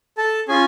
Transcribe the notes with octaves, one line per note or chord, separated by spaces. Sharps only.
A4 A5
C#4 F4 G#4 G#5